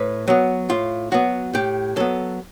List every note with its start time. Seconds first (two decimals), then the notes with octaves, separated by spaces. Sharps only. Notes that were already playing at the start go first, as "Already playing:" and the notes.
Already playing: A2 B4
0.28 F#3 B3
0.70 A2 F4
1.12 F#3 B3 F#4
1.54 A2 G4
1.96 F#3 B3 A4